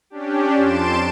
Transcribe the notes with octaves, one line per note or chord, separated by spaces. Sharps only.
C#4 D4 G4
F2 A5 C6 D7 E7